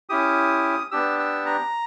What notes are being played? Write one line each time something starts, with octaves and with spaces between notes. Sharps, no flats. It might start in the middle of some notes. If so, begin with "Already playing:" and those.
C#4 E4 G4 D#6
B3 D4 G4 E6
E6
A#5